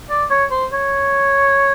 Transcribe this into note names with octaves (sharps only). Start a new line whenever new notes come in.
D5
C#5
C5
C#5